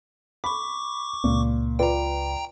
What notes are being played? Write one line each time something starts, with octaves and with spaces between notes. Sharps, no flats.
B5 C#6 D6
C#2 A#2
F4 B4 D5 G5 A#5